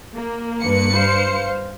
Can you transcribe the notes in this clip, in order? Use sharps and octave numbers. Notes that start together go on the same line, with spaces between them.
A#3
G2 B4 C#7
C5 F5